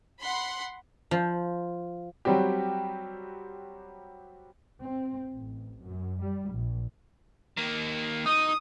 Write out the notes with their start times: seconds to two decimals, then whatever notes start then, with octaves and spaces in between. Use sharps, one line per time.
0.21 F#5 B5 C6
1.11 F3
2.25 F#3 G3 C4 F#4 G4
4.80 C4
5.32 A1
5.82 F#2
6.22 G3
6.51 A#1
7.57 D#3 A#3
8.26 D#4 D#6